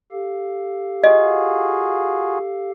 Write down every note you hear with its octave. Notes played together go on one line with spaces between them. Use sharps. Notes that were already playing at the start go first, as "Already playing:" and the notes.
G4 A4 F5
F4 F#4 G#4 D#5